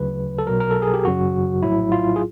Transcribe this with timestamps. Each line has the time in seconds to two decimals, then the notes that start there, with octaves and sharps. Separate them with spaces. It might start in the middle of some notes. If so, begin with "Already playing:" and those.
Already playing: D2 C#3 F#3 B4
0.38 A4
0.47 B1 B2 F#3 A#4
0.60 A#4
0.71 A4
0.82 G#4
0.94 G4
1.05 G#1 F#2 C#3 F#3 F#4
1.62 A#1 A2 F#3 E4
1.92 F4
2.16 G#4